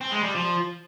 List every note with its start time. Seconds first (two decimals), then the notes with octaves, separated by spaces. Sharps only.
0.01 C4
0.12 G#3
0.24 G3
0.35 F3